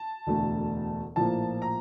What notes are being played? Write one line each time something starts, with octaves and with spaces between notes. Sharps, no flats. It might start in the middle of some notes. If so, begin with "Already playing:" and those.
Already playing: A5
E1 D2 D3 A3
A#1 A2 F3 A#3 A5
A#5